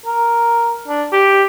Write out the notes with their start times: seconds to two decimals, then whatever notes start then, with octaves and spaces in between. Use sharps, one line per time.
0.06 A#4
0.88 D4
1.12 G4